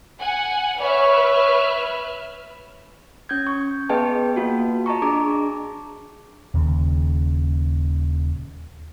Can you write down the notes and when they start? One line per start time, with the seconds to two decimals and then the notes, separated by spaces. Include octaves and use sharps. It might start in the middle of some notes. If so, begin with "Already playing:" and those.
0.21 F#5 G#5
0.81 B4 C#5 E5 F6
3.29 C#4 G6 G#6
3.47 C#6
3.89 B3 G#4 B4 D#5 G5 A5
4.36 A#3 F4 F#4
4.86 D#5 A5 A#5 C#6
5.02 D4 G#4 A#5 D6
6.54 D#1 D#2 C#3